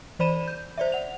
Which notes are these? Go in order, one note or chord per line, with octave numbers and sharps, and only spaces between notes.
E3 C5 D5 B5 D#7 E7
G6
C5 D5 E5
F#5 F7